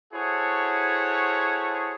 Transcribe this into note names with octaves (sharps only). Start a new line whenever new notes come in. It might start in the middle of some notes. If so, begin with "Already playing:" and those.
E4 F#4 G#4 A4 C5 C#5